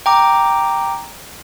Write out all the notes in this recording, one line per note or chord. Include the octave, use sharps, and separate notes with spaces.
G5 A#5 D6